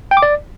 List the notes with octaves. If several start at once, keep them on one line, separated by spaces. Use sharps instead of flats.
G5
D6
D5